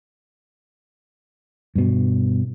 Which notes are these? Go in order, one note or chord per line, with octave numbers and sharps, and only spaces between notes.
G2 B2